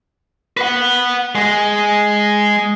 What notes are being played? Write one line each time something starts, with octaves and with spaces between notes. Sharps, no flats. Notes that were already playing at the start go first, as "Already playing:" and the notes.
B4 F#5
G#3